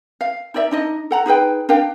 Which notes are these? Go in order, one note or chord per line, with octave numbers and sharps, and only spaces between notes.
F5
D#4 A#4 D5 E5
D4 D#4 D#5
A4 F#5 A#5
D#4 G#4 B4 G5
D4 A#4 F5 G5